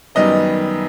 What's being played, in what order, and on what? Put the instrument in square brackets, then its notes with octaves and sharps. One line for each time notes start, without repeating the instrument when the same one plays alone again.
[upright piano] F#2 D#3 G3 B3 D#5